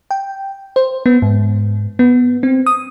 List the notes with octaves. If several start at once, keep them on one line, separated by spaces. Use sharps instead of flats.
G5
C5
B3
G#2
B3
C4
D#6